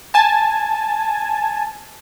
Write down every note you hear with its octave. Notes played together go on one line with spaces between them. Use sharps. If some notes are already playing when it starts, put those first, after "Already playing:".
G#5 A5